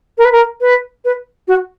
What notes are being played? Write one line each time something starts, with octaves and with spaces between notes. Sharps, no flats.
A#4
B4
A#4
B4
B4
F#4